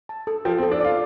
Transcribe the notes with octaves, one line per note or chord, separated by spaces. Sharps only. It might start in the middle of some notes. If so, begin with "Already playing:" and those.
A5
A4
F3 G5
C4
A4
D4
F4 D5